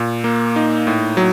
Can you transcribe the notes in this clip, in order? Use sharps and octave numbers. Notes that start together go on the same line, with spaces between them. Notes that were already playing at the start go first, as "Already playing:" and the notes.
Already playing: A#2
A#3
D#4
A2
F#3